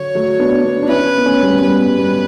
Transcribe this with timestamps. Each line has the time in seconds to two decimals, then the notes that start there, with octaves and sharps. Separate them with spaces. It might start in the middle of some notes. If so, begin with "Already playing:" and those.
Already playing: D3 F#3 C#5
0.15 F#3 A3
0.39 B3 D4
0.64 B3 D4
0.82 D4
0.88 C#4 E4 B4
1.18 B3
1.25 A3 C#4
1.43 G3 B3
1.62 G3 B3 B4
1.99 G3 B3